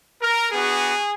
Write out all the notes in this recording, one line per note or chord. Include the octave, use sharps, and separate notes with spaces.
A#4
B3 D4 F#4 G#4